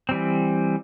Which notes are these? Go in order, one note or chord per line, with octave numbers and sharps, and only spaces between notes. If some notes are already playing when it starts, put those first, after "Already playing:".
E3 G3 C4